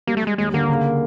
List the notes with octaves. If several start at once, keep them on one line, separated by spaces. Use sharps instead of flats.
G3 A#3
A3
G3 G#3
D#2 G#3
D3 A#3
C#3